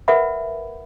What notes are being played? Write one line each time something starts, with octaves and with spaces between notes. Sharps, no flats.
A#4 B4 E5 F#5 B5